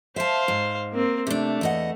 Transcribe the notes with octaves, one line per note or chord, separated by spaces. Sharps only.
C5 E5 F5 A5
G#2
A#3 C4
C3 A3 D4
E2 D#5 F#5